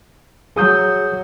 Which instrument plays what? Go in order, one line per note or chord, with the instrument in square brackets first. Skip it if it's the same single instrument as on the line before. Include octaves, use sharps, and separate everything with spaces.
[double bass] F#3 [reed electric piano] G#4 D#6 G6